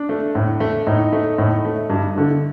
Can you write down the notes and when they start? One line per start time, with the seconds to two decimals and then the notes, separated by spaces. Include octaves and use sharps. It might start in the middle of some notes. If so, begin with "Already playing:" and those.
Already playing: D4
0.09 A3
0.35 A2
0.60 A3
0.86 A2 D#4
1.12 A3
1.38 A2
1.65 A3
1.90 G2
2.16 D3 A3